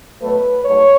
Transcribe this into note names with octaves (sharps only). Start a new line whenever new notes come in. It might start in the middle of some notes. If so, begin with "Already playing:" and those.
B2 F#3 A3 B4
G#2 F#3 A3 C#5